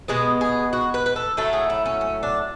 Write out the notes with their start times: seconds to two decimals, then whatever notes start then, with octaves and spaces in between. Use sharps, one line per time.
0.08 B2 G#3 B3 G#4
0.41 G#4
0.73 F#4
0.94 B4
1.06 B4
1.16 A4
1.37 A2 F#3 A3 A4
1.53 G#4
1.70 E4
1.86 C#4
2.01 C#4
2.23 D4